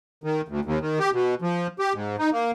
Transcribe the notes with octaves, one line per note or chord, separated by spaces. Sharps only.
D#3
D2
D#2
D#3
G4
B2
F3
G4
G#2
D#4
A#3